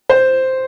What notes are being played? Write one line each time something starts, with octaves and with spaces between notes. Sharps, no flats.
C5